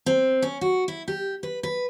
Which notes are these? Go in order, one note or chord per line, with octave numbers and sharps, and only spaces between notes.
C4
C#4
F#4
E4
G4
B4
B4